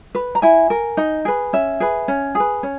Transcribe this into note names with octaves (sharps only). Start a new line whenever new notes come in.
B4
A#5
E4 G#5
A#4
D#4
G#4 B4
C#4 E5
G#4 B4
C#4
G#4 B4
C#4